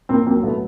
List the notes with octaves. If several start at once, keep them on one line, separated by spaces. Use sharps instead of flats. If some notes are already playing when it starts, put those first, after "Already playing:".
A2 A#3 C4
F#3 A#3 C4
A2 A3 B3